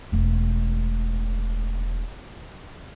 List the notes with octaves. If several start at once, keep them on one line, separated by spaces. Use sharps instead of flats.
E1 A3